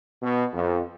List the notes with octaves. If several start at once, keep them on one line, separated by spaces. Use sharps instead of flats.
B2
F2